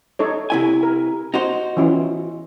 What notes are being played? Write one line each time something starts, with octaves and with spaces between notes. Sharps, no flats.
D#4 A4 C#5
C3 E4 G#5
A#4
D#4 F#4 C5
E3 C#4 F4